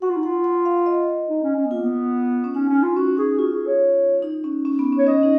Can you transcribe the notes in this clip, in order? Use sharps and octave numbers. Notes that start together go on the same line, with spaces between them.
F#4 F#5
F4
D#4
F4 F#5
F#5
F5
D#5
D#4
C#4
C#4
B3
A#3 F4
B3
C#4
C#4 D#4
C#4
F4
C#4 F#4
D#4 G#4
F4 F#4
G#4
C#5
D#4
C#4
C#4
B3
C#4
C#5
C#4 D#5
D#4